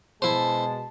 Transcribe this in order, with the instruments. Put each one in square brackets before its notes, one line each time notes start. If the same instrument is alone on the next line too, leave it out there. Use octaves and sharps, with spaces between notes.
[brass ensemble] B2 G#3 A5 [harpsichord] E4 C5